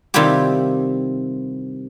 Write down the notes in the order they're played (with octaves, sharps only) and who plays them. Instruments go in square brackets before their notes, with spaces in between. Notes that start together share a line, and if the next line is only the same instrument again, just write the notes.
[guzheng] C3 D#3 G3 E4 F4 G4